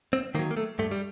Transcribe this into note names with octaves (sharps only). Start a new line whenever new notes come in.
C4
D#3 F#3 A#3
A#3
A3
G2 A3
G3